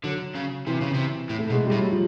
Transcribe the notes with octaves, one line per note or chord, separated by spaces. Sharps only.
D3 F#3
C#3
C3 E3
C#3
C3
A2
A3
B2 G#3
G3
A2
F#3
F3